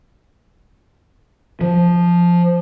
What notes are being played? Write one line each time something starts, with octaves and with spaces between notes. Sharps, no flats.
F3